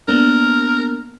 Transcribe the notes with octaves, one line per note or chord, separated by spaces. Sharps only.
A#3 B3 D4 A#4